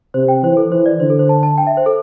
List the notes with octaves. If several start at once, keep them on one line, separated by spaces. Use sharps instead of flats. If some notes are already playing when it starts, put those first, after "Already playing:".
C3 C5
G5
E3 C5
A4
E3 C5
D5
D3 C5
A4
C5
A5
A5
G5
E5
C5
A4